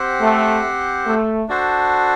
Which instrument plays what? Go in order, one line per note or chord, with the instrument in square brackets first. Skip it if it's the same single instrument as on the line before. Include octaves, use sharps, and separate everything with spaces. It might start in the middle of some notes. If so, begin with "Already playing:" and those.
Already playing: [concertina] C4 G4 C5 F#5
[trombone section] A3
A3
[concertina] D4 F#4 A4 C5